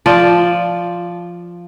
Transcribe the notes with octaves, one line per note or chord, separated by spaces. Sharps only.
F3 D5